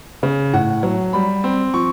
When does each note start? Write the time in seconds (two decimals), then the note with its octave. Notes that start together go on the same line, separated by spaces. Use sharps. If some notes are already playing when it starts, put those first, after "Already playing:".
0.23 C#3
0.53 A2 F#5
0.83 F#3
1.13 G3 B5
1.44 C4
1.74 F3 C#6